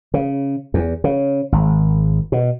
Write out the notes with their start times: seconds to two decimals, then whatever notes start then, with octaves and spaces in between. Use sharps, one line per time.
0.14 C#3
0.74 E2
1.04 C#3
1.52 G#1
2.32 B2